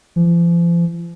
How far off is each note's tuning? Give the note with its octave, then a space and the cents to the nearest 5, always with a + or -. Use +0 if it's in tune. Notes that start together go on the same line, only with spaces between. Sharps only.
F3 -40